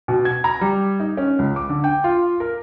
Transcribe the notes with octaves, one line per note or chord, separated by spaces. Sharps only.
B2
G#6
A#5
G3
D#4
C#4
C#2
D6
D3
G5
F4
A#4